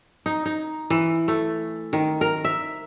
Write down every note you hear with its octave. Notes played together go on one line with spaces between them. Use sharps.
D#4
D#4
E3
A3
D#3
A#4
E5